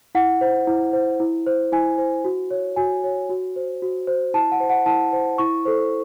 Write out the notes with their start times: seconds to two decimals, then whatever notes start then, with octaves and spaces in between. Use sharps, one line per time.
0.15 E4 F#5
0.41 C5
0.67 E4
0.93 C5
1.20 E4
1.47 C5
1.72 E4 G#5
1.98 C5
2.24 F#4
2.51 C#5
2.76 F#4 G#5
3.04 C#5
3.29 F#4
3.56 C5
3.82 F#4
4.07 C5
4.34 E4 A5
4.52 F#5
4.60 C5
4.70 F#5
4.86 E4 A5
5.13 C5
5.38 E4 C#6
5.65 A4 C5